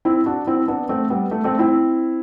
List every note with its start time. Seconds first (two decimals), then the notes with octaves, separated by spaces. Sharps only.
0.05 C4 E4
0.26 D4 F#4
0.47 C4 E4
0.68 B3 D4
0.89 A3 C4
1.10 G3 B3
1.31 A3
1.44 A3 C4
1.59 C4 E4